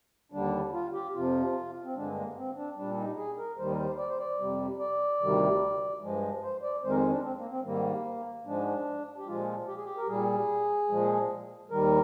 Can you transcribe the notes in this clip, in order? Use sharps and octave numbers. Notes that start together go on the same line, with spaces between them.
D#2 D3 G3 D4
F4
G4
F2 C3 F3 F4
C4
G2 D3 G#3 D4
A#3
C4
D4
A#2 G3 D4
D#4
G#4
A#4
D#2 D#3 G3 C5
A#4
C5
D5
C5
D5
F2 C3 G3
D5
D2 C3 D#3 G3
G2 F3 G#3
C5
D5
F2 D#3 G#3 C5
A#4
C5
D4
C4
A#3
C4
G#2 D#3 G3 A#3
G#2 F3 G#3 D4
G4
A#2 F3 G#3 F4
G4
G#4
G4
A#4
A#2 G3 G#4
A#2 F3 G#3
D#2 D#3 G3 A#4